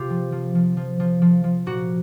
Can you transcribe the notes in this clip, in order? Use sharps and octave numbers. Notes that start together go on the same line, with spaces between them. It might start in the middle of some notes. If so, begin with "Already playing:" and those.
Already playing: C3 F4 G4
F3
F3
F3
F3
F3
F3
F3
A#2 F#4